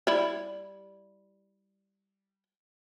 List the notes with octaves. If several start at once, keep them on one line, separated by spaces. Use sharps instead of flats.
G3 E4